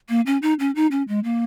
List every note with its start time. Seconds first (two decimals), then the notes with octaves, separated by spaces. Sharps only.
0.09 A#3
0.26 C#4
0.42 D#4
0.60 C#4
0.75 D#4
0.91 C#4
1.08 G#3
1.24 A#3